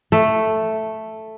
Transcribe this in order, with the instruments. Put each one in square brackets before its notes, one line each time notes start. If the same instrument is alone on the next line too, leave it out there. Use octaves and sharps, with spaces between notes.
[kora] A3